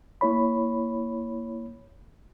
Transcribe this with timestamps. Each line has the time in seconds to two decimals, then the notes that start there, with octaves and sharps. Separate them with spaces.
0.21 A#3 E4 C#5 B5